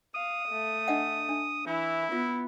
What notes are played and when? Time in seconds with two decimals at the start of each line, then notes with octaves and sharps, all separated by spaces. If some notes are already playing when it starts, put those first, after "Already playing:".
0.15 F5 D#6
0.49 A3
0.88 D4 D#5 F#5
1.29 D4
1.66 E3 E4
2.12 B3 F4